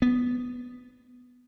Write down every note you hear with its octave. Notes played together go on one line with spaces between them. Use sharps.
B3